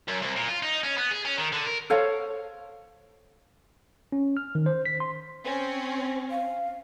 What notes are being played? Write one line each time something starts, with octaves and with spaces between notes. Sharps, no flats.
F#2
C2
A#2
F4
D#4
C#4
B3
G#4
C#4
D#3
D3
A#4
A4 C5 C#5 F5
C#4
F6
D#3
C5
B6
C6
C4 C#4
F5